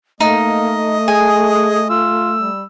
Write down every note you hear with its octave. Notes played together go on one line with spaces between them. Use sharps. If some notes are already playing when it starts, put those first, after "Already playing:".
A3 A#3 D#4 D#5
G#4 G#5
F4 E6
G3